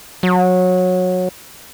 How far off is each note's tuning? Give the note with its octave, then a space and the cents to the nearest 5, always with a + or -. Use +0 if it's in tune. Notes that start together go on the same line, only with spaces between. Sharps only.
F#3 -20